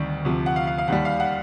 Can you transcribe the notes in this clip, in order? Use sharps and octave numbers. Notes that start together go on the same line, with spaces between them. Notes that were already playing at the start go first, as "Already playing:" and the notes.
Already playing: D2 C3 D#3 G3
D2 C3 F3
F#5
F5
F5
F5
D#2 D#3 G3 F#5
F5
F#5